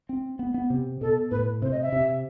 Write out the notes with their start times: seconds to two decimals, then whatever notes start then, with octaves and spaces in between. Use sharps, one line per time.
0.09 C4
0.39 B3
0.54 B3
0.70 C3
1.01 B2 A4
1.31 A2 B4
1.62 C3 C5
1.72 D#5
1.82 E5
1.92 C3